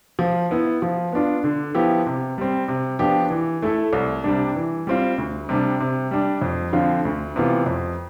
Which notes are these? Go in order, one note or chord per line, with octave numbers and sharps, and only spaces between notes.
F3
B3 E4
F3
B3 D4 F4
D3
F3 B3 E4 G4
C3
G3 C4
C3
F3 B3 D4 G4
E3
A3 E4 A4
C2
C3 G3 D4
E3
G3 C4 F4
D2
C3 G3 D4
C3
G3 D4
F2
D3 F3 C4 F4
D2
C3 E3 B3 F4
F2